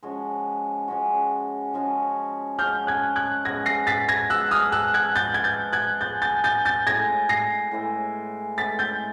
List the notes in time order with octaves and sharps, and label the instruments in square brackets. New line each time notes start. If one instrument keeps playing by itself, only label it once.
[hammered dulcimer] F3 G#3 C#4 F#4
F3 G#3 C#4 F#4
F3 G#3 C#4 F#4
[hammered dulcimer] F3 G#3 C#4 F#4 [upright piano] F6 G6
[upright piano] F#6 G#6
F#6 G#6
[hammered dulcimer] F3 G#3 B3 [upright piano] G#6 A#6
[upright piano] A#6 C7
A6 B6
G#6 A#6
[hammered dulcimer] F3 G#3 B3 [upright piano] E6 F#6
[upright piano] D#6 F6
E6 F#6
F#6 G#6
[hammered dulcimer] F3 G#3 B3 [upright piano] G6 A6
[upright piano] G#6
G6 A6
F#6 G#6
[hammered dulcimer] F3 G#3 B3 [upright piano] G6 A6
[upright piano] G6 A6
G6 A6
G6 A6
[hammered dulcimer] A2 E3 G#3 [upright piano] G#6 A#6
[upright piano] A#6 C7
[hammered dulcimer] A2 E3 G#3
[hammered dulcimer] A2 E3 G#3 [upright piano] A6 B6
[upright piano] G6 A6